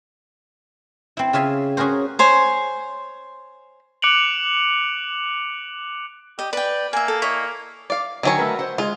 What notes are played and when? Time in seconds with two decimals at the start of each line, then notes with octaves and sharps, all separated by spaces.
1.17 C4 E4
1.33 C#3 F4 E5 G#5
1.77 C#4 F#4 G#4 A#4 C5
2.19 C5 C#5 G#5
4.02 D6 F#6 C#7 D7 F7 F#7
6.39 G4 D#5
6.53 B4 D5 G5
6.93 A#3 E5 G#5
7.08 A4
7.22 E4 C#5 D#5
7.90 D5 F5
8.23 D3 D#3 F#3 C#5 G#5
8.38 A3 A#4 B4
8.59 C5 F#5
8.78 G#3 F4 G#4